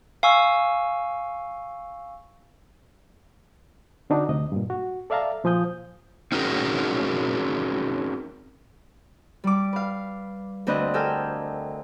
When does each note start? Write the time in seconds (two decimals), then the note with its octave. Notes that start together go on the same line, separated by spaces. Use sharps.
0.23 F5 G#5 C#6 E6
4.10 D3 C4 D4 D#4 F#4
4.29 D2 C3 D#5
4.52 G2 A#2
4.70 F#4
5.10 A4 D5 E5 F5 A5 A#5
5.44 A#2 F3 G#5 D#6 G6
6.32 C4 C#4 D#4 F#4 G#4 A#4
9.44 G3 D6
9.73 B4 F5
10.67 D2 C4 D4 B4 D#5 F#6
10.94 G4 A4 A#4 G5 G#5 F6